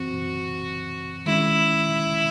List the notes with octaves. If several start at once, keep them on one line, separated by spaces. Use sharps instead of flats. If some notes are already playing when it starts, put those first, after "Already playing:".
Already playing: F#2 E3 C4 F#4
D#3 G#3 C#4 E4